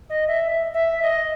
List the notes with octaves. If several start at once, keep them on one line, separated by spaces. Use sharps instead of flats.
D#5
E5
E5
D#5